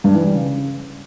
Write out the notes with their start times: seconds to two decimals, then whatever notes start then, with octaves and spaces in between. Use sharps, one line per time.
0.04 G2
0.14 E3
0.24 G3
0.34 C#3